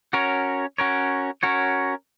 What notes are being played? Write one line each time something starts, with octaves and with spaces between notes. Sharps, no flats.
C#4 F#4 A#4 C#5
C#4 F#4 A#4 C#5
C#4 F#4 A#4 C#5